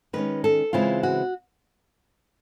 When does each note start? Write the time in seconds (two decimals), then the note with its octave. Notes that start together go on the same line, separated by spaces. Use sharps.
0.13 D#3 G#3 C#4 B4
0.44 A4
0.73 C#3 E3 G#3 C4 E4 F4
1.03 F#4